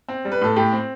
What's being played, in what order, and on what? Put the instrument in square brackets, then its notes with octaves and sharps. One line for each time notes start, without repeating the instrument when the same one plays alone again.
[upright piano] C4
G3
B4
A2 A4
A2 G4
C4